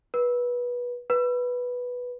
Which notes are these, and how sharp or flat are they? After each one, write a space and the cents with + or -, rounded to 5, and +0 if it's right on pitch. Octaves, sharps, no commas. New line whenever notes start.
B4 -20
B4 -5